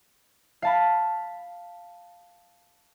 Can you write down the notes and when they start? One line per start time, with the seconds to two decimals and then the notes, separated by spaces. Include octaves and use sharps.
0.62 F5 A5 B5